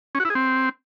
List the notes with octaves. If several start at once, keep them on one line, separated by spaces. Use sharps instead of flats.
C#4
F#4
E4
G#4
C4